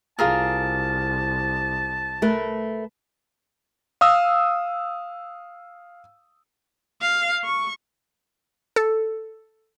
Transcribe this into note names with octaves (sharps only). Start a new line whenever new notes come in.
C2 F4 G#4 A#4 A5
A3 A#4 B4
F5 D#6 E6
F5
C#6
A4